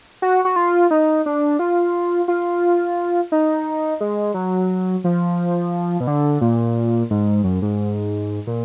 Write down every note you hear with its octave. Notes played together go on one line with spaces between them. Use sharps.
F#4
F#4
F4
D#4
D4
F4
F4
D#4
G#3
F#3
F3
B2
D3
A#2
G#2
F#2
G#2
A#2